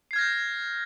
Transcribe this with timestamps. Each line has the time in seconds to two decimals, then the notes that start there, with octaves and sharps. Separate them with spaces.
0.11 C7
0.13 G#6
0.16 F6
0.18 A#6
0.21 G6